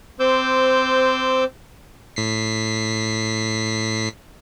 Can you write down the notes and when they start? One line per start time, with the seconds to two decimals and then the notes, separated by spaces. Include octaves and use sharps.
0.20 C4 C5 D6 E6 G6
2.16 A2 B6 C7